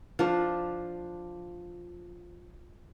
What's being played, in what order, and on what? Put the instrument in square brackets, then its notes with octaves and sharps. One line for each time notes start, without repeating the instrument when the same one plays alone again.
[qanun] F3 D4